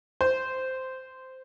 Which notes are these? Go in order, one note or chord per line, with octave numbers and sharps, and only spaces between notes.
C5